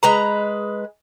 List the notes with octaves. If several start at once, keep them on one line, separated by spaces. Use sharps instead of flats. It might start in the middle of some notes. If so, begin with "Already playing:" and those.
G#3 B4 A#5